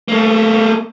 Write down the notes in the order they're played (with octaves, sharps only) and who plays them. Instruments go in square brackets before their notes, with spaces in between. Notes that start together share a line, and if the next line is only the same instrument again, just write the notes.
[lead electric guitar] A3 A#3